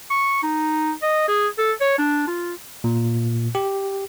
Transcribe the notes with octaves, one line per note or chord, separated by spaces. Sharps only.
C#6
D#4
D#5
G#4
A4
C#5
D4
F4
A#2
G4